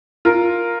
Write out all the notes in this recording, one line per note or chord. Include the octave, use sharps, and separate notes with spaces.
F4 A#4